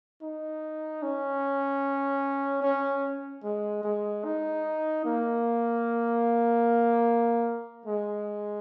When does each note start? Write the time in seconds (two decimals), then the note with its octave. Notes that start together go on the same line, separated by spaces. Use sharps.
0.22 D#4
1.03 C#4
2.63 C#4
3.44 G#3
3.83 G#3
4.25 D#4
5.05 A#3
7.86 G#3